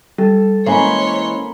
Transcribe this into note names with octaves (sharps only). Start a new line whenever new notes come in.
G3 A4
E3 G#3 A#3 C#4 C5 C#5 B5 C6